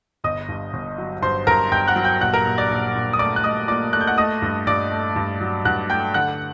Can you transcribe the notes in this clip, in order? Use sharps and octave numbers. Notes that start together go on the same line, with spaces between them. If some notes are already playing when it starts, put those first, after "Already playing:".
G1 D#5 D#6
G2
G1
F#3
G2 C5 C6
G2 A#4 A#5
G2 G5 G6
F#5 F#6
F#3
G5 G6
A#1 F#5 F#6
A#4 A#5
A#1
D5 D6
A#1
A#1
D#6
A3 D5 D6
F#6
A3 D#5 D#6
A#2 D5 D6
A3 F#6
G6
F#5 F#6
A3 D#5 D#6
G2
G2 D5 D6
A3
G2
F#3
G2 F#5 F#6
A3 G5 G6
D3 F#5 F#6